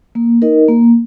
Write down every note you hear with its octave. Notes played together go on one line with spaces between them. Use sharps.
A#3
D#4 A#4 D#5
A#3